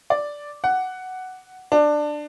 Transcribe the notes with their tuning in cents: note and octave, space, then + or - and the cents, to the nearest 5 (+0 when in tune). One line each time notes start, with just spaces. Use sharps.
D5 -5
F#5 +5
D4 +15